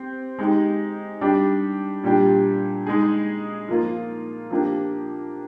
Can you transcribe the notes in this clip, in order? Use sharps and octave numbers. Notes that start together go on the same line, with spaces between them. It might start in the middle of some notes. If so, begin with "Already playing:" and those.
Already playing: C4 G4
G#3 D#4 G4
G3 D4 G4
A#2 G3 D4 G4
G#3 D#4 G#4
F3 A#3 F4
F3 A#3 D4 G4